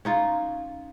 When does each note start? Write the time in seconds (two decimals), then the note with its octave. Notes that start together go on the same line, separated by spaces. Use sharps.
0.05 C#4 D#4 F4